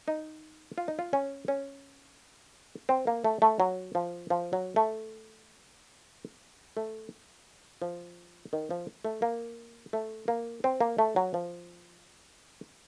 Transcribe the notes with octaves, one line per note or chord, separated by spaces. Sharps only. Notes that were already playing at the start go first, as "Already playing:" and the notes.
D#4
F4
D#4
F4
C#4
C#4
C4
A#3
A3
A3
F#3
F3
F3
F#3
A3
A3
F3
D#3
F3
A3
A#3
A3
A#3
C4
A#3
A3
F#3
F3